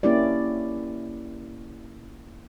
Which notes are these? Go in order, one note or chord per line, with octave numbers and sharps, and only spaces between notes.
A#3 C#4 E4 G4 D5